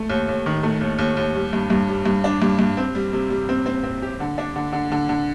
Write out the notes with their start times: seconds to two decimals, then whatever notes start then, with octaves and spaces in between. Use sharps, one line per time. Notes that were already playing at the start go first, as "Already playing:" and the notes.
Already playing: A3
0.09 D#2
0.28 D#2
0.46 D#3
0.63 A3
0.81 D#2
0.99 D#2
1.17 D#2
1.35 G3
1.53 G2
1.70 G2
1.88 G3
2.05 G2
2.24 D4
2.42 G2
2.59 G2
2.77 C4
2.95 G3
3.13 C3
3.30 G3
3.49 C4
3.66 C4
3.83 C4
4.02 G4
4.20 D3
4.38 D4
4.56 D3
4.73 D3
4.92 D3
5.09 D3